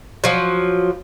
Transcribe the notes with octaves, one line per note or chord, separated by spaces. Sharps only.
F3 F#3